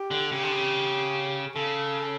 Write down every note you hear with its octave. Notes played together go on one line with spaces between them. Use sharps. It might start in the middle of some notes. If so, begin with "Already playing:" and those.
Already playing: G4
D3
C#3 G4
D3
C#3
C#3 A4